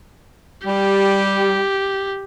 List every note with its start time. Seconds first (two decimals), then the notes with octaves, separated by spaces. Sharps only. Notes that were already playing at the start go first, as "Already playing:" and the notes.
0.66 G3 G4